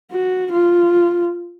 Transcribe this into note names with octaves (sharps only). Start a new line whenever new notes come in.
F#4
F4